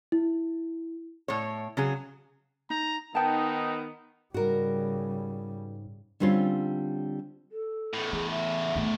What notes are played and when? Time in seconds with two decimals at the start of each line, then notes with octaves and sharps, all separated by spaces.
0.12 E4
1.28 A2 C#5
1.77 C#3 F#3 G#4
2.70 D#4 A#5
3.15 D#3 B3 D#4 G5 A5
4.34 G#2 C#3 G3 F#4 A#4
6.20 D3 G3 C4 C#4 F4
7.51 A4
7.94 E2 A2
8.13 E3 G#4
8.30 E5
8.76 D3 A3